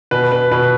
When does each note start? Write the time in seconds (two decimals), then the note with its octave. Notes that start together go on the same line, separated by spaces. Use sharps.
0.11 B2 B4
0.32 B4
0.51 B2 B4